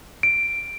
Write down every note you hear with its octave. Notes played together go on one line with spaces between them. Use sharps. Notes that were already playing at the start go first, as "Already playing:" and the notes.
D7